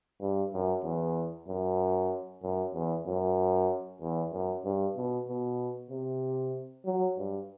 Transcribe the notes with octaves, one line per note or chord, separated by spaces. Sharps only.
G2
F#2
E2
F#2
F#2
E2
F#2
E2
F#2
G2
B2
B2
C3
F#3
G2